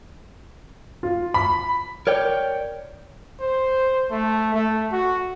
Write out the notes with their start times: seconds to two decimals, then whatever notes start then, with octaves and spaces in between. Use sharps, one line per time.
1.03 F4
1.34 B5
2.07 A#4 C#5 D5 G5
3.40 C5
4.11 A3
4.54 A3
4.92 F#4